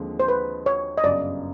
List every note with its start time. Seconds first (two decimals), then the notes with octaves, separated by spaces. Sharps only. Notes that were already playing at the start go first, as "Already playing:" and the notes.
Already playing: D#2 D3 F3 G#3 C4
0.20 C5
0.28 B4
0.66 C#5
0.98 D#5
1.04 G1 F#2 C#3 D5